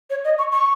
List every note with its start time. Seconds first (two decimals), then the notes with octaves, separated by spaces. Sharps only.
0.10 C#5
0.25 D#5
0.39 C#6
0.52 C#6